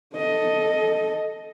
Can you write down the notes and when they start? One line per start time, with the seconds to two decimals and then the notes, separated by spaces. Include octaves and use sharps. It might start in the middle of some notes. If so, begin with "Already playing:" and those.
0.16 A4 D#5